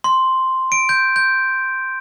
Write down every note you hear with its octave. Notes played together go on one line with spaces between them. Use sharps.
C6
D7
G6
G6